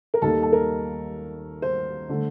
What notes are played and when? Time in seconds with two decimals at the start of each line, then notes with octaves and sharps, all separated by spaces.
0.14 A#4
0.22 D#2 D#3 G3 A#3 A4
0.43 A4
0.52 A#4
1.62 C5
2.09 D3 A3